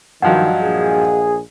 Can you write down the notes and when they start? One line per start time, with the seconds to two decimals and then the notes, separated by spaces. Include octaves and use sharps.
0.22 G2 D#3 F3 F#3 D#5 F5 F#5
0.63 A#1 G#4